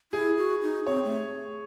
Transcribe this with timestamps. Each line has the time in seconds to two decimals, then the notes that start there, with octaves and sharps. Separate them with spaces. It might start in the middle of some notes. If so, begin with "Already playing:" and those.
0.13 E4 G#4
0.37 F#4
0.62 D#4
0.87 C4 C#5
1.04 A3